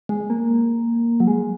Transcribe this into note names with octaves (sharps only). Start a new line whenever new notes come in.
G#3
A#3
F#3
G#3